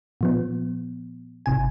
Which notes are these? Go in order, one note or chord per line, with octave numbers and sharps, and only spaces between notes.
A#2 F3 B3
G#1 C3 G#5